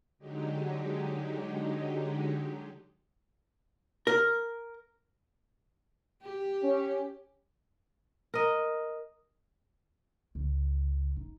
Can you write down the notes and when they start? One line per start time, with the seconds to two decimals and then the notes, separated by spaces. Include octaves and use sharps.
0.19 D3 F#3 G#3 D#4 G4
4.07 A#4
6.23 G4
6.63 C#4
8.34 A#4 D#5
10.35 C#2
11.16 D#4